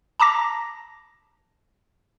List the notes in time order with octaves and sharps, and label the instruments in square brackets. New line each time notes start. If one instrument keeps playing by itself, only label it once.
[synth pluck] A5 A#5 D6 A#6